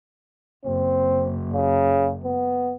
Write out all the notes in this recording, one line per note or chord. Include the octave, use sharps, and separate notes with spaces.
F#1 C4
C#3
B3